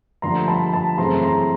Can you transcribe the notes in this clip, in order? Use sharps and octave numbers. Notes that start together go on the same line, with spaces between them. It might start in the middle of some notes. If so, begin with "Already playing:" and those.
G2 D3 F3 A3 A#5 C6
A5 B5
A5 B5
F#2 C#3 E3 A3 C4 A#5 C6
A#5 C6